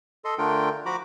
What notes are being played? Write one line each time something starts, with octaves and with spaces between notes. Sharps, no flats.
A4 D#5 C6
D3 A3 D4 F4 A#4 G5
F3 F#4 A#5 B5 D6